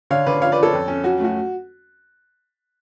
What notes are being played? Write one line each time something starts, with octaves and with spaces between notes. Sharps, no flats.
D3 C#5 F5
D3 B4 D5
F3 C#5 F5
B4 D5
F3
A4 C#5
F2
C#4
F#3 F#4
A3 F#4